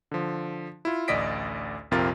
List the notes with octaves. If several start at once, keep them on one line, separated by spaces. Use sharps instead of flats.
D3 F3
E4 F4
A1 D2 D5 D#5 B6 D7
A#1 F2 C3 F4 A#4 A6